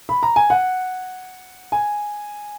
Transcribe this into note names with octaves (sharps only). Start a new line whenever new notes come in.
B5
A#5
G#5
F#5
G#5